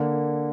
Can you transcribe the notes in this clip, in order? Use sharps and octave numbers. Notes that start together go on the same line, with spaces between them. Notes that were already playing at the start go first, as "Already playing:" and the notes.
Already playing: D3 A#3